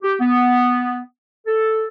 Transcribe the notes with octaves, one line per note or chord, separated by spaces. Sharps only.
G4
B3
A4